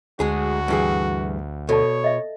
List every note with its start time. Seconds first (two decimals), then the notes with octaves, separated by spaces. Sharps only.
0.20 D2 G#3 F#4 G#4 A5
0.68 G2 E3 G#4
1.69 B2 A4 C#5 D5 A5
2.04 D#5 E5